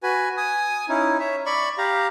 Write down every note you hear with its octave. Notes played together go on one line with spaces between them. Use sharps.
F#4 B4 G#5
G#5 D#6
C#4 D#4 E4
C#5 E5
D5 B5 C#6
G4 F5 A#5